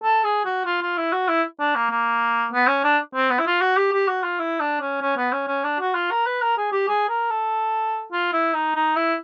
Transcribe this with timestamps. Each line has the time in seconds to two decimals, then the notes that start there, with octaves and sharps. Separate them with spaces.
0.04 A4
0.24 G#4
0.45 F#4
0.66 F4
0.82 F4
0.98 E4
1.13 F#4
1.29 E4
1.60 D4
1.75 A#3
1.91 A#3
2.53 B3
2.68 C#4
2.84 D4
3.15 C4
3.31 B3
3.39 E4
3.47 F4
3.62 F#4
3.77 G4
3.93 G4
4.08 F#4
4.24 F4
4.40 E4
4.60 D4
4.81 C#4
5.01 C#4
5.17 B3
5.33 C#4
5.48 C#4
5.64 D4
5.80 F#4
5.95 F4
6.11 A#4
6.26 B4
6.42 A#4
6.58 G#4
6.72 G4
6.88 G#4
7.09 A#4
7.30 A4
8.12 F4
8.33 E4
8.54 D#4
8.75 D#4
8.97 E4